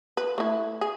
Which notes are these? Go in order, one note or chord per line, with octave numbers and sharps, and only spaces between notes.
B4
A3 E4
G#4